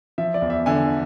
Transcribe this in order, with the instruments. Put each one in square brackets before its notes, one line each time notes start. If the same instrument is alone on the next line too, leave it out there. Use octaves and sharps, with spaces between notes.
[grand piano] F3 E5
D5
E2
E5
D3 G#5